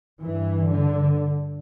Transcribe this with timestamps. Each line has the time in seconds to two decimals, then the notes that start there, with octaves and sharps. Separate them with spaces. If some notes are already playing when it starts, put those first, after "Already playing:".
0.22 G2 E3
0.70 D3